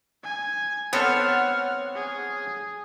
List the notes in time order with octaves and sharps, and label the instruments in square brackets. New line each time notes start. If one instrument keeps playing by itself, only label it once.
[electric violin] G#5
[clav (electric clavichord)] B3 C4 A4 [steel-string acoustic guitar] C#5 [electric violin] F#5 F6
[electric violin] G#4